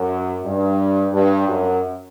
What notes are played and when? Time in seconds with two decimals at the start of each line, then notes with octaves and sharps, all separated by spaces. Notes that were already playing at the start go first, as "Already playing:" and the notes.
Already playing: F#2
0.43 G2
1.13 G2
1.48 F#2